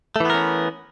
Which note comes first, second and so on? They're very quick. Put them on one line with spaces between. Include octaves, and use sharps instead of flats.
A3 E3 B3 A#4 C#4